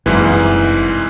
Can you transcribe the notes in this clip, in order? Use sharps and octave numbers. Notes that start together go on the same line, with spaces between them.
F#1 C2 G#2 E3